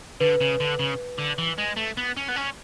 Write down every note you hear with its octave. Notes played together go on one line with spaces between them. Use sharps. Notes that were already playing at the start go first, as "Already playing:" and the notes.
D3 B4
C#3
D3
C#3
D3
E3
G#3
A3
B3
C#4
B3
C#4